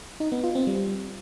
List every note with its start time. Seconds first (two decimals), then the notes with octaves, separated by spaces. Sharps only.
0.20 D#4
0.32 B3
0.44 F4
0.55 C4
0.67 G3